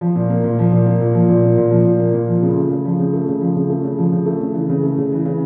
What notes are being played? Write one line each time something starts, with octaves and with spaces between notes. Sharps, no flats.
F3
A#2
A#3
A#2
F3
A#2
A#3
A#2
F3
A#2
A#3
A#2
F3
A#2
A#3
A#2
F3
C#3
A3
C#3
F3
C#3
A3
C#3
F3
C#3
A3
C#3
F3
C#3
A3
C#3
E3
C#3
A3
C#3
E3
C#3